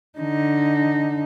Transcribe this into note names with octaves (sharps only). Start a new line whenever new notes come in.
D3 D#4